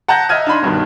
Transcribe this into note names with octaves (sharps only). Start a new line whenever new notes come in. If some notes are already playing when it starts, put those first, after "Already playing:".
F#5 A5 A#5 F#6 G6 A#6
D#5 E5 F6 G#6 D#7
D4 D#4 B5 C6
B1 G2 D#3